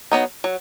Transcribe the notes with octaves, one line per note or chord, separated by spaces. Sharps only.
F#3 B3 D#4
F#3